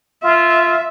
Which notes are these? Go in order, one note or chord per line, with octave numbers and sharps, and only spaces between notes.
F4 E5